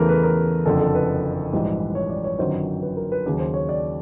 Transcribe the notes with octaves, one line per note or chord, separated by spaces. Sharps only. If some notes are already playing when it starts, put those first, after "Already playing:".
Already playing: E2 C#3 E3 A3 A#4
B4
A#4
F#1 F2 D3 A4
A4
B4
A#1 G#2 E3 G3
C#5
D5
C#5
G1 F#2 D#3 F#3 C5
B4
A#4
B4
D#2 C#3 F#3
C5
C#5
D5